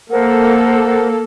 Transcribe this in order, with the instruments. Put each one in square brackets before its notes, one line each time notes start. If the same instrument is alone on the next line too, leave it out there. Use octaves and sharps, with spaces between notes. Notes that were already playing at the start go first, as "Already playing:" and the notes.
[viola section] A#3 A4 [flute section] A#4 C5 F#5